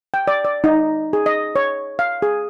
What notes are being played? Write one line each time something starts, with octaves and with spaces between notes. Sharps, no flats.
G5
D5
D5
D#4
G#4
D#5
C#5
F5
G#4